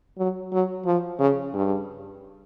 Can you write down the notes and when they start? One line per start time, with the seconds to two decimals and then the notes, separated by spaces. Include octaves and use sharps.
0.18 F#3
0.52 F#3
0.86 F3
1.19 C#3
1.54 G2